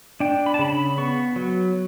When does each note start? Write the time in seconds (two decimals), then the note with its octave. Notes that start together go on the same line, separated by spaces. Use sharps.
0.20 D4 G5
0.46 B5
0.54 A5
0.59 C#3 B5
0.73 B5
0.98 B3 C#6
1.36 F#3